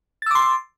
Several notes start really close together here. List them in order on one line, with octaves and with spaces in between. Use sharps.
A6 E6 D6 C6